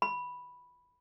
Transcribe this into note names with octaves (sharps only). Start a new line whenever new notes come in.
B5